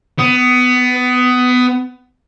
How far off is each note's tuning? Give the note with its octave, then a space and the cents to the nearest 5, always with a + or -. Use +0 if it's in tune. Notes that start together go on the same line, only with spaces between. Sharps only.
B3 +20